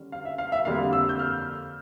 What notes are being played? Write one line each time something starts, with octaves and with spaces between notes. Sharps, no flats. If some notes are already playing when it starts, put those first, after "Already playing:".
Already playing: D3 G3 C#4
F5
E5
F5
E5
F2 D3 G3 A#3 F5
E6
G6
F6